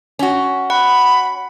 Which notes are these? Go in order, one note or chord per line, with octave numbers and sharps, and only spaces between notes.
C#4 F#4
F#5 B5